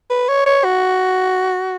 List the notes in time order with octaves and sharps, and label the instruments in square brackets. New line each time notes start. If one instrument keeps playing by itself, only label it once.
[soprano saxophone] B4
C#5
C#5
F#4